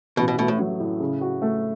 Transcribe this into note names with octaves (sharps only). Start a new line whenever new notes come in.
A1 B2
B2
B2 A3
A2
F#3
A2
C#3
F#4
A3